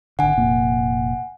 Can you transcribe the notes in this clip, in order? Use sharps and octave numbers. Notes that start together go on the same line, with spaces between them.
G#1 D3 F#5 G#5
F1 A#2 A#3